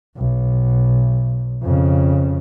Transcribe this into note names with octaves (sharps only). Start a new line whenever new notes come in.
B1
F2 C#3